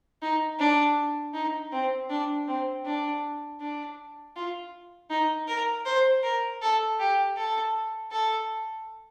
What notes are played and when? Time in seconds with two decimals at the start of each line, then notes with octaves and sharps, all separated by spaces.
0.22 D#4
0.59 D4
1.34 D#4
1.72 C4
2.10 D4
2.48 C4
2.85 D4
3.60 D4
4.36 F4
5.10 D#4
5.48 A#4
5.85 C5
6.23 A#4
6.62 A4
6.99 G4
7.37 A4
8.12 A4